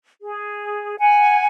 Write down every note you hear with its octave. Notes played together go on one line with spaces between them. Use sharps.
G#4
F#5 G#5